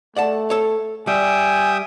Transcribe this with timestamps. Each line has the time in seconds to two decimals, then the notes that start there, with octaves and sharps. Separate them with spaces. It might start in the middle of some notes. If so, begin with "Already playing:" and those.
0.17 A3 D5 F#5 A5
0.50 A4 C#5
1.07 G3 E5 G5 G#5 D#6